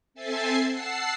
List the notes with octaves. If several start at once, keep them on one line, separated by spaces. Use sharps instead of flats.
C4 A4 E5 G#5 A6 C7
F#5 A5 E6 C7